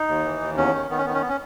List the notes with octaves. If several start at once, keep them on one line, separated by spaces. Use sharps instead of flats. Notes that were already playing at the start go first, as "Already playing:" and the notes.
Already playing: D#4
D#2
E3
D#2
E2 C#4
D#3
D#3 B3
C#4
D#3 B3
C#4
B3
C#4